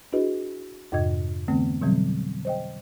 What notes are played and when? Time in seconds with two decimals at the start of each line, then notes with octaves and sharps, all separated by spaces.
0.13 D4 E4 F#4 G#4 B4 D#5
0.92 F2 G#2 C3 D#5 G#6
1.48 D3 E3 A3 B3 C4
1.81 B2 D3 E3 F#3 G3 C4
2.45 C5 D#5 G5